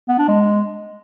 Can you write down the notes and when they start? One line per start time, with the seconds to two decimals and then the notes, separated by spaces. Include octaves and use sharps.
0.09 B3
0.18 D4
0.28 G#3